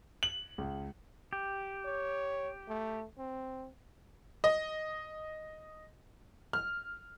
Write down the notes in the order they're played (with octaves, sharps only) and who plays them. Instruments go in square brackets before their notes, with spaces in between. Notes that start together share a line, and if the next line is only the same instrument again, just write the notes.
[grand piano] F#7
C#2
[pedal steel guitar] G4
[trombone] C#5
A3
C4
[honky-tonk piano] D#5
F6